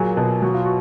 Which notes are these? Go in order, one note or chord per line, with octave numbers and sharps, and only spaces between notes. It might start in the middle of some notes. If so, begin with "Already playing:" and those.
Already playing: A#2 F#3 G#4
B2
F#3 F#4
F4
F#4